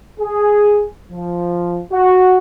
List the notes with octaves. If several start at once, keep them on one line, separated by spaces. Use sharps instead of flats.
G#4
F3
F#4